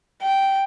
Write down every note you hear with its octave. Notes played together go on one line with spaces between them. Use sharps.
G5